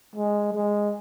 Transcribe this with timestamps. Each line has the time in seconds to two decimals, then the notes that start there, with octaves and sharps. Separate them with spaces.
0.16 G#3
0.53 G#3